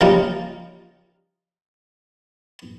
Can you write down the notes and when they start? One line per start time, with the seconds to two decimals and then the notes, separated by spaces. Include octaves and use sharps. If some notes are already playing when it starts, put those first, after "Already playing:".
0.01 C#3 F3 G3 A#3 D#4 F4